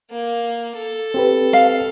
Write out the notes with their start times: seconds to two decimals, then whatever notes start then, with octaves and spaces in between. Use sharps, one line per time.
0.11 A#3
0.76 A4
1.14 C4 G4 B4
1.53 F5